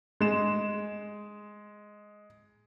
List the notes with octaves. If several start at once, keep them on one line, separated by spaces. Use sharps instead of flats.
G#3 E7